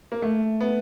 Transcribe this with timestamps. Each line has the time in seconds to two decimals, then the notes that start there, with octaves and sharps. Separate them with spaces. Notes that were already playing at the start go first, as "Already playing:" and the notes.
0.12 A#3
0.22 A3
0.61 B3